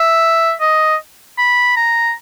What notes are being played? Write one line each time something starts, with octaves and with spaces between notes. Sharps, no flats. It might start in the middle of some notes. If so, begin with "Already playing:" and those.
Already playing: E5
D#5
B5
A#5